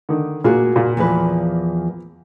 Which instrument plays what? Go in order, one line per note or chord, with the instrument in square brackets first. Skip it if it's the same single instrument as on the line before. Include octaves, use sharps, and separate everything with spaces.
[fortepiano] D3 D#3
[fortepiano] A#2 F4 [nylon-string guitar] A#3 F#4 G#4
[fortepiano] A#2 F4
[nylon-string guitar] E2 F3 B4